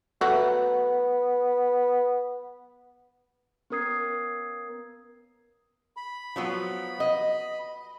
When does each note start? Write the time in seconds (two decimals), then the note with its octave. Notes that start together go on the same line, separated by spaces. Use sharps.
0.21 F#3 A3 B3 F#4
3.70 B3 C#4 A#4 D#6 G#6 C7
5.97 B5
6.36 F3 F#3 B3
7.00 D#5